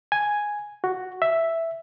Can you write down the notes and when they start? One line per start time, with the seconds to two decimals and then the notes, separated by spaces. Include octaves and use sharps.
0.12 G#5
0.84 F#4
1.22 E5